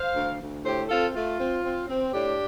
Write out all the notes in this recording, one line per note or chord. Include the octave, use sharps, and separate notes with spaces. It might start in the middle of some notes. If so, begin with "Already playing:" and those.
Already playing: C5 F5
D2
D2
A2 G4 C5
C4 F4 A4
A3 F4
C4
C4
C4
A2 D4 G4